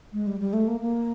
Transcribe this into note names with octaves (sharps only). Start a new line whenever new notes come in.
G#3
G3
G3
A3
A#3
A#3